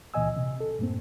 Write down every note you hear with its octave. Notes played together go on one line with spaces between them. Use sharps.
C#2 A#2 E3 D#5 G#5 E6
C3
A4
F#2 A2 A3 A#3 C4